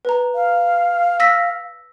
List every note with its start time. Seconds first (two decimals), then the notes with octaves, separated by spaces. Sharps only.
0.05 B4 A#5
0.35 F5
1.20 E6 A#6 B6